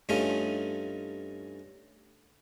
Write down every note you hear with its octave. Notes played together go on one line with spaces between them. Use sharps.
G2 A3 C#4 D#4 F4